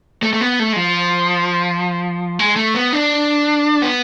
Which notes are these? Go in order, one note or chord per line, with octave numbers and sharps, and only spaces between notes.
A3
A3
B3
A3
G#3
F3
G#3
A3
B3
D4
B3